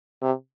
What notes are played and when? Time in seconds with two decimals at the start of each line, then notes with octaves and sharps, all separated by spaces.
0.22 C3